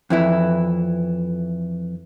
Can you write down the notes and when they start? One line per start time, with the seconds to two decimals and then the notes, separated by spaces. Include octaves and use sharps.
0.10 F2 E3 E4